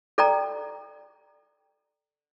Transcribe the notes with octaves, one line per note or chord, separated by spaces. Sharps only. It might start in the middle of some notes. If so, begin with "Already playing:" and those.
A4 D5 G5 A#5